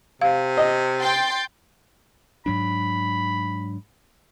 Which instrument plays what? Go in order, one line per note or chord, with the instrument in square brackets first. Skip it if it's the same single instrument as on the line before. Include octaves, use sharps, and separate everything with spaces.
[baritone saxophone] C3 [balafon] F5
[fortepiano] D#5
[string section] G5 C6 A6
[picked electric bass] G#2 F#3 D4 [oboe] B5